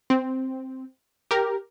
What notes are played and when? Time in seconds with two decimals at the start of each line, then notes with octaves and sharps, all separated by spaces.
0.10 C4
1.31 G4 A#4